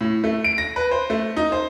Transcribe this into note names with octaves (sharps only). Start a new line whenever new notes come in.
A2
A3
D7
A#6
B4
C5
A3
D#4
C5